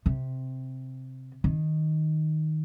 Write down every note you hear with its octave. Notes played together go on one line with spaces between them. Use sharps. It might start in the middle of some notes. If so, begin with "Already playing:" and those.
C3
D#3